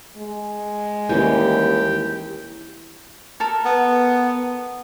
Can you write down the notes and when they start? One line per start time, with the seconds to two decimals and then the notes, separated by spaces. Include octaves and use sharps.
0.17 G#3
1.09 D#2 E3 G3 C#4 G4
3.40 A4 A#4
3.65 B3